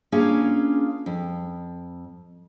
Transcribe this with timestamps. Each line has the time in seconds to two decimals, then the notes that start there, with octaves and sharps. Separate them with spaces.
0.12 A#3 C#4 D4 F4 G#4 F5
1.06 F2